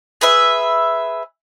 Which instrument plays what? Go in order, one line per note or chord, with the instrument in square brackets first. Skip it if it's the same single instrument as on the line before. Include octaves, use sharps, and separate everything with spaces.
[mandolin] G#4 B4 E5